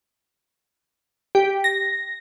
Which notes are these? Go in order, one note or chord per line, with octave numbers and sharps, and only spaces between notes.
G4
A#6